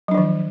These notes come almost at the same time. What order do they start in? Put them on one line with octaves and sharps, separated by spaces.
F#3 D4 F3 D#3